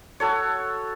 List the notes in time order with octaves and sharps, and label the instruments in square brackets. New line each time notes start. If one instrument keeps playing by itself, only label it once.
[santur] F#4 A4 C#5